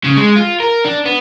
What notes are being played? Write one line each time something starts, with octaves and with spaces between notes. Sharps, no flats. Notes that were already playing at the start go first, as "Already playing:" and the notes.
C#3
G#3
F4
A#4
D4
B3